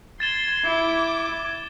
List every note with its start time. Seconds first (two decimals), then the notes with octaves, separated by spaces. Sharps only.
0.20 C6 G#6 A6 E7 G7
0.64 E4 D6